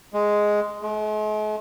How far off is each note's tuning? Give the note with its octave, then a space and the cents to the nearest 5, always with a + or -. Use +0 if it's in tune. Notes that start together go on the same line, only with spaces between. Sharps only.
G#3 +0
G#3 +45